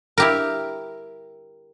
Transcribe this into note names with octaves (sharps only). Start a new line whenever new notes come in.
E4 G4 A#4